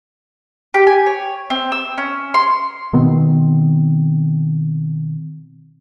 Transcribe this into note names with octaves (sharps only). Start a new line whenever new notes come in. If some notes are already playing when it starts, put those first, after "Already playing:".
G4
G#5
C#5
C4
E6
C#4
C6
B2 D#3 B3 C4